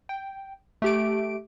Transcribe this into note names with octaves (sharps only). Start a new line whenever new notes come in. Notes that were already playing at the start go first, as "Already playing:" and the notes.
G5
A3 G4 D7